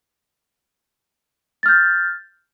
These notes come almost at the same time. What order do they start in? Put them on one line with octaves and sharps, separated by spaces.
A6 F6 G6